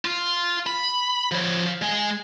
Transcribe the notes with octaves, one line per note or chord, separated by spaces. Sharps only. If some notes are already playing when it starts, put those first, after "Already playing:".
F4
B5
F3 C#5
G#3 G#5